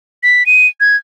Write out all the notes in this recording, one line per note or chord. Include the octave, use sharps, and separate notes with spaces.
B6
D#7
G#6